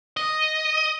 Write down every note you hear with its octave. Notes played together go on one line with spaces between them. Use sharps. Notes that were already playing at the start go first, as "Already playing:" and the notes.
D#5